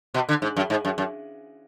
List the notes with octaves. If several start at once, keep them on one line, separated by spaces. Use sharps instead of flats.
B2
D3
G#2
F#2
G#2
F#2
F#2